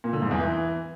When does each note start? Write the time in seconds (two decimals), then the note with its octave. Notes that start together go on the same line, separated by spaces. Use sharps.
0.04 A#2
0.13 D3
0.22 G#2
0.31 E2
0.40 E3